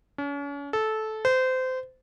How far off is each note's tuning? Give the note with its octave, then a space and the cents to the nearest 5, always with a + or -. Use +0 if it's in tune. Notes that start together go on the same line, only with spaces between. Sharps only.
C#4 +40
A4 -15
C5 -25